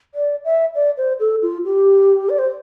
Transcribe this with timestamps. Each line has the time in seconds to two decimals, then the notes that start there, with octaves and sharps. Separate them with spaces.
0.15 D5
0.44 E5
0.75 D5
0.97 C5
1.20 A4
1.42 F4
1.65 G4
2.29 D5
2.39 C5